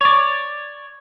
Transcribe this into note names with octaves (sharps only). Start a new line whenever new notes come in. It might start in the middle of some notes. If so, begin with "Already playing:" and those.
C#5 D5